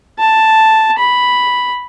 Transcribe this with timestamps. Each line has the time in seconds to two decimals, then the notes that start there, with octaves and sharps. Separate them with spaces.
0.19 A5
0.98 B5